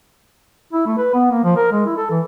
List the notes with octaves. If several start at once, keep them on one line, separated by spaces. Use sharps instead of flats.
E4
A3
B4
B3
A#3
F3
A#4
G#3
E4
A4
E3